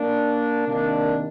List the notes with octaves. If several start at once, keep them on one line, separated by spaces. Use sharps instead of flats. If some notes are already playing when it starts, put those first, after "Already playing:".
Already playing: A#3 D4
C3 D#3 A#3 D4